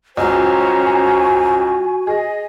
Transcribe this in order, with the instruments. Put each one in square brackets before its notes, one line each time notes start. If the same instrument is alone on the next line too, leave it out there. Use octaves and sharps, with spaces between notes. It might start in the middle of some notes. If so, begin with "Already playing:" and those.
[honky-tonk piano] C#2 [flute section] C#4 C5 A#5 [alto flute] F#4 [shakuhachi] G#5
[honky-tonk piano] G#4 [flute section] D#5